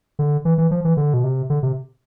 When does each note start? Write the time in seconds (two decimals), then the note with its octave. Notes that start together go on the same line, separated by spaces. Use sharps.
0.19 D3
0.45 E3
0.58 E3
0.71 F3
0.85 E3
0.97 D3
1.14 B2
1.24 C3
1.50 D3
1.63 C3